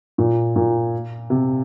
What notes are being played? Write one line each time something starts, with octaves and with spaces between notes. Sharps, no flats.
A#2
A#2
C3